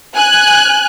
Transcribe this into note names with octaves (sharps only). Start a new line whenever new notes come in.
G#5 F#6